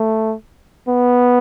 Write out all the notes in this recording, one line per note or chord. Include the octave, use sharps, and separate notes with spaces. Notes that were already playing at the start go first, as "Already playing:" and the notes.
Already playing: A3
B3